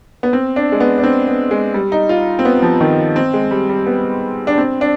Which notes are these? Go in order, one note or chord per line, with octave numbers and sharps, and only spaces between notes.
B3
C4
D4
G#3
B3
D4
C4
B3
G#3
G3
D#4
F4
C4
B3
F3
D#3
C4
G#3
G3
G3
B3
D4
C4
D4